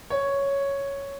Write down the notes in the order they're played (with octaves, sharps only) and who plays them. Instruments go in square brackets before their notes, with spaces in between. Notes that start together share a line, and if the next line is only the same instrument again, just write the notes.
[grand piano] C#5